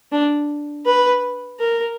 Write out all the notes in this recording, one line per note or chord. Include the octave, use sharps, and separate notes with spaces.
D4
B4
A#4